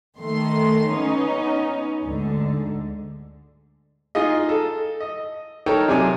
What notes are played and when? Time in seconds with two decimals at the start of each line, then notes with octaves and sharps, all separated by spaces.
0.19 D#3 A3 C6
0.89 B3 C#4 D#4
2.03 D2 G#2 D3
4.15 D#4 F4 G#4 D#5
4.49 A4
5.00 D#5
5.66 D#4 A4 A#4 C#5 G5
5.88 C3 F#3 G#4 D5 G#5